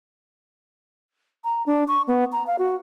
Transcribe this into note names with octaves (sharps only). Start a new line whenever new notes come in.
A#5
D4
C#6
B3
A#5
F5
F#4